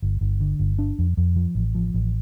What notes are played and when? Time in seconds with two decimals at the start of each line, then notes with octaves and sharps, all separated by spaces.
0.02 G1
0.21 G1
0.40 D3
0.60 G1
0.79 D4
0.99 F2
1.17 F2
1.36 F3
1.55 A1
1.75 F3
1.94 A1